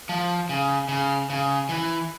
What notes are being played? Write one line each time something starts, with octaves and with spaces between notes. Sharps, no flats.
F3
C#3
C#3
C#3
E3